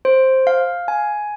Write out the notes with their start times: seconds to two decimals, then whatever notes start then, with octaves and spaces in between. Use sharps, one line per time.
0.05 C5
0.47 F5
0.88 G#5